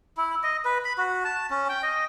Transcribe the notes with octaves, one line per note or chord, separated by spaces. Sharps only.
E4
D#5
B4
B5
F#4
A5
C#4
G5
D#5